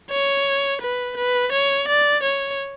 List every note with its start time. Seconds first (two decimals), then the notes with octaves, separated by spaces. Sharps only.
0.11 C#5
0.81 B4
1.17 B4
1.52 C#5
1.88 D5
2.23 C#5